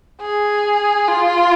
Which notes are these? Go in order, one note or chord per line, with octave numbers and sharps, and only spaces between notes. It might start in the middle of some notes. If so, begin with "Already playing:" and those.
G#4
F4